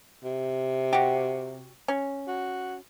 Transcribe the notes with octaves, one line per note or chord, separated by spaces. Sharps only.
C3
F#4 G4
C#4
F#4